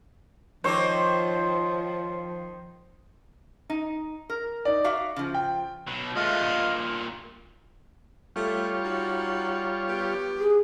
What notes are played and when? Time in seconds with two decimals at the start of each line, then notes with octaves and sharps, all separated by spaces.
0.64 D#3 F3 C4 D#4 C5 C#5 D6
3.70 D#4
4.30 A#4
4.65 D#4 D5
4.84 F#4 E5 F5 D6
5.16 C#3 F3
5.34 G5
5.88 B2 F#3
6.16 G#3 A3 F4 D#5 F6
6.41 G2 A#2
8.36 G3 A3 F4 C#5
8.84 D#4 F#4
9.88 B3 G4
10.39 G#4